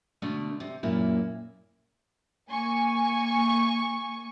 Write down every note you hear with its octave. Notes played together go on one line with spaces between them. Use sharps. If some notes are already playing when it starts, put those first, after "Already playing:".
B2 D3 A3
C3
F#2 A#2 A#3 E4
A#3 G#5 C#6